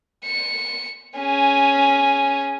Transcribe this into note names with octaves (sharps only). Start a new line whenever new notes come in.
C#7
C#4 G#4